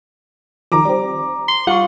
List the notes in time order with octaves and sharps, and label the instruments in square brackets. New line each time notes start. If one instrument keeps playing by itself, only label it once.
[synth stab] D#2 D#3 F3 [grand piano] A#5 D6
[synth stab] G3 C4
[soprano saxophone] C6
[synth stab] G3 F#4 [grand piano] F4 C#6 [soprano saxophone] F#5